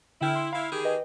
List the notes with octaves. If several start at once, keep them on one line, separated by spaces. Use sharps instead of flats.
D3 E4 G5 F6
C6
E4 F5 B5
D#3 G4 G#4
B4 D#5 G5